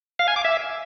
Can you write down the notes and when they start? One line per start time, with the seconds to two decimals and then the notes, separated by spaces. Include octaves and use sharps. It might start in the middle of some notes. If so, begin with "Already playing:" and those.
0.19 F5
0.28 G#5
0.36 D6
0.45 E5